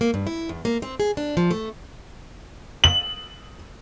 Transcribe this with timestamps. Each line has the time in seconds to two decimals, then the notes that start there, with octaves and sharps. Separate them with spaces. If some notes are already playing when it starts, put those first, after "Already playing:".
0.01 A#3
0.14 G2
0.27 E4
0.49 E2
0.65 A#3
0.82 C4
1.00 G#4
1.17 D4
1.37 F3
1.51 A3
2.84 F#7